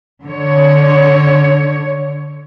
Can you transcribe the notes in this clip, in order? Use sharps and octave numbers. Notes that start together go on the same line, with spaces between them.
D3 C#5